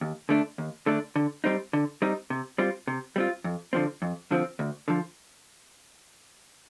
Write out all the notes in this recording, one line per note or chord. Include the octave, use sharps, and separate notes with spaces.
D#2
D3 A3 D4
D#2
D3 A3 D4
D3
G3 C4 D#4
D3
G3 C4 D#4
C3
G3 C4 F4
C3
G3 C4 F4
F2
D3 F3 C4
F2
D3 F3 C4
D2
D3 F3